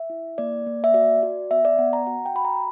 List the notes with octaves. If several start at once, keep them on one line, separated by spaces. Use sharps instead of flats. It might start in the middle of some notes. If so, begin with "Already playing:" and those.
Already playing: E5
E4
A#3 D5
A#3
E5
F#4 D5
F#4
B3 E5
D5
B3 F#5
A#5
F#4 F#5
G5
F#4 B5
A#5